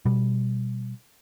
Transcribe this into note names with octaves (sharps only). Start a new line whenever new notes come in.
B2 G3